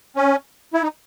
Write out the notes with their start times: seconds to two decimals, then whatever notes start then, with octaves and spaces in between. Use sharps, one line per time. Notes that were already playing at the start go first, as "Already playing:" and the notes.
0.16 C#4
0.74 E4
0.83 D#4